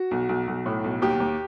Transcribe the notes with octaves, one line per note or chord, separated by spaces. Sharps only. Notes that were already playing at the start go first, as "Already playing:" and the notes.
Already playing: F#4
B1
B1
B1
A2
B1
D#2 G4
D#2